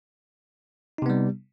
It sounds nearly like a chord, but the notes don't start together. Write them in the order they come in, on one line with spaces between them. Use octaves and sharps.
D#4 C3 B3 G3